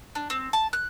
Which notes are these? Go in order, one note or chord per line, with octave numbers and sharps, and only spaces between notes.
D4
C4
A5
F#6